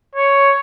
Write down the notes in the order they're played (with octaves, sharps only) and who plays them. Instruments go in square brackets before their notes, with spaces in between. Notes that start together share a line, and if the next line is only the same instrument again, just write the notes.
[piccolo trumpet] C#5